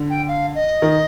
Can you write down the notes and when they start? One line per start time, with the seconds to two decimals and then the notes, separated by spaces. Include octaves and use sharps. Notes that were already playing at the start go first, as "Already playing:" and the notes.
Already playing: D3
0.10 G5
0.28 F5
0.55 D#5
0.82 D#3